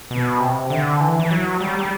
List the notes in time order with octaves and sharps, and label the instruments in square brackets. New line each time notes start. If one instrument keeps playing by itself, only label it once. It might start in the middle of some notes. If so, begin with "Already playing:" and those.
[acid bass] B2
C3
D3
E3
E3
F#3
G3
G3